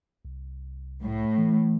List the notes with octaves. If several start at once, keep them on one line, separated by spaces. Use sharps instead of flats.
C2
A2
E3